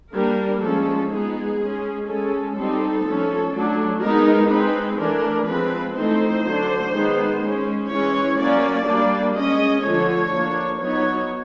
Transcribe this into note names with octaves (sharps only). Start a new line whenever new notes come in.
G3 A#3 D4 A#4
F3 G#3 C#4 A4
G#3 B3 D#4 G#4
G#3 C#4
G#3 C#4 A4
G3 C4 D#4 A4
F3 A3 C#4
F#3 A3 D4
G#3 B3 D#4 A#4
G#3 C4 D#4 B4
E3 A3 D4 A#4
F3 G#3 C4 B4
E3 A3 C4 D#4 C5
D3 F#3 A3 D4
D#3 G#3 B3 D#4
G#3 C#4
E3 G#3 C#4 C#5
F#3 A#3 C#4 D5
G3 A#3 D4
G#3 C#4 D#5
D3 F3 A3 C#5
F3 A#3 D4
F#3 B3 D#4 C#5